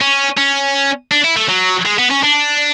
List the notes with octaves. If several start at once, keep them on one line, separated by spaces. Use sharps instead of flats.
C#4
C#4
D4
E4
A3
F#3
G#3
B3
C#4
D4